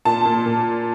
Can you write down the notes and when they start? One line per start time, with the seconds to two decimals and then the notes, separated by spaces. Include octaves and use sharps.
0.05 A#2 A5
0.25 A#2
0.46 A#2